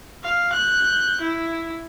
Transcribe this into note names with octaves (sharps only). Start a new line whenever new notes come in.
F5
F#6 G6
E4